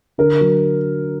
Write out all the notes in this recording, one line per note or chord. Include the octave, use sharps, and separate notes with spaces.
D3 A#4
F#3